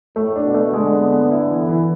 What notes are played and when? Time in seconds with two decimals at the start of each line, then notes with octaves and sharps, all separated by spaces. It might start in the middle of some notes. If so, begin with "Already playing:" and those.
0.16 A2 A3
0.36 D4
0.45 B2
0.54 A3
0.74 D3 G#3
0.93 B3
1.12 B3
1.31 E4
1.50 E3
1.69 E3